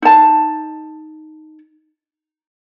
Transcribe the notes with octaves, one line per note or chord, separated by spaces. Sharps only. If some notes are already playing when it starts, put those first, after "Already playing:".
D#4 A5